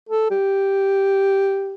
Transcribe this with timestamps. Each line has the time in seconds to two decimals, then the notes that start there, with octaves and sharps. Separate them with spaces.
0.09 A4
0.31 G4